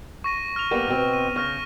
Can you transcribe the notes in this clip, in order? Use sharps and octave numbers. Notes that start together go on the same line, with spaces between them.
C#6 A#6 D#7
F6 F7
G3 A#3 B3
B2 C4
D#7
C#3 C#6 F6 A#6